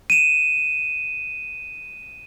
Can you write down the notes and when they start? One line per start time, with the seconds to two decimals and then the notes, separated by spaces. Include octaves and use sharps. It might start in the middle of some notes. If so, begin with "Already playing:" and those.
0.10 D#7 E7